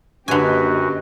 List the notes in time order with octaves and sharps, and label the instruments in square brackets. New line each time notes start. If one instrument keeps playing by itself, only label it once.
[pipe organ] F#2 F#4 [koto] D3 G#5 [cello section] A#3 G4 D#5 [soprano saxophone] B4